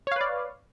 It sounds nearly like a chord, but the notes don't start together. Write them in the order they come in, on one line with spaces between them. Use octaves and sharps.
C#5 F5 B4 D5